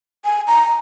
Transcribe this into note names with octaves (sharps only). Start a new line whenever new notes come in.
G#5
A#5